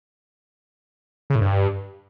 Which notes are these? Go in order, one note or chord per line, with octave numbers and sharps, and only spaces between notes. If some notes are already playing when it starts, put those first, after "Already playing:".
C#3
A2
G2